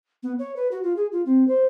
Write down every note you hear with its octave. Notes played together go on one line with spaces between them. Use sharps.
B3
C#5
B4
F#4
F4
G#4
F4
C4
C5